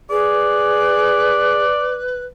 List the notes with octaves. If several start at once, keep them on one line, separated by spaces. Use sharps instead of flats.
G#4 B4 D5